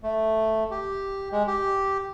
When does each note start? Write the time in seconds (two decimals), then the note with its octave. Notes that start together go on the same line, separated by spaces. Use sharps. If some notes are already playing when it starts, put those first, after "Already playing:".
0.03 A3
0.71 G4
1.32 G#3
1.47 G4